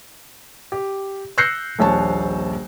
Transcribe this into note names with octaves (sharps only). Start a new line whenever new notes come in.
G4
E6 F#6 G6 A#6 C7 C#7
D#1 A#1 C#5 A5